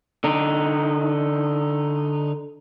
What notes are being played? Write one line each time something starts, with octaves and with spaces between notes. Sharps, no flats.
D3 D#4